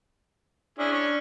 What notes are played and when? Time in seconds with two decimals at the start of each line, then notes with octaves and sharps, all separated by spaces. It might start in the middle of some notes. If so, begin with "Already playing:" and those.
0.79 C#4 D4 E4 G#4
0.92 C#4 C#5